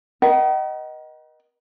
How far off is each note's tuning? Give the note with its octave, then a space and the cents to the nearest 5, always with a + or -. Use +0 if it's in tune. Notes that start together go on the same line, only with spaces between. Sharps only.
A#4 +45 D#5 +0 F#5 +45